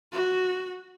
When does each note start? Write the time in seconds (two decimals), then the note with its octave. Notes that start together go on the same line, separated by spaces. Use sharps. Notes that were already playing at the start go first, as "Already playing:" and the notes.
0.12 F#4